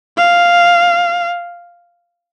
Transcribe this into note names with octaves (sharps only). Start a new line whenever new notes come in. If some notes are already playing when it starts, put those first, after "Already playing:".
F5